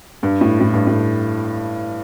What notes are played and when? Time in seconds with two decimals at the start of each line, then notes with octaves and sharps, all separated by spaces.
0.23 G2
0.41 A2
0.60 A2
0.73 G2
0.87 A2